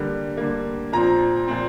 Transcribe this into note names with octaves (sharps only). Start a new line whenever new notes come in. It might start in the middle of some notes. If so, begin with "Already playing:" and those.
Already playing: D3 G3 A#3
D3 G3 A#3
A#2 F3 C4 A#5
A#2 F3 C4